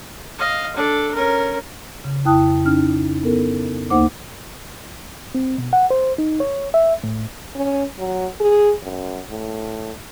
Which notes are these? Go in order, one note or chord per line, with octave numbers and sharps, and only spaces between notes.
D#5 F5
D4 A4
C#4 A#4
C#3
F2 E4 G5 A5 D#6 F#6
C#4 D#4 F6
B3 A4 A#4
D2 A#3 D#4 C5 F#5 D6
C4
B2
F#5
C5
D#4
C#5
E5
A2
C#4
F#3
G#4
F#2
A2